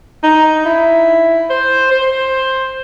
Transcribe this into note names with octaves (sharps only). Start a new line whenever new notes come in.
D#4
E4
C5
C5